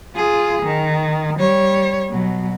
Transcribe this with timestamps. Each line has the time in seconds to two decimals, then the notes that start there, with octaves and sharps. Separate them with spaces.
0.16 F4 G#4
0.62 D#3
1.39 G3 C#5
2.10 B2 F#3